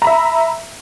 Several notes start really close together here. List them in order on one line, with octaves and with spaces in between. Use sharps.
A#5 B5 E5